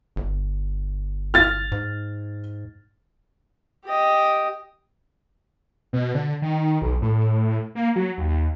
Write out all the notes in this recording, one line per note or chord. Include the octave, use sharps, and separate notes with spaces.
G1
F6 A6
G#2
G4 D#5
B2
D3
D#3
B1
A2
A#3
F#3
D#2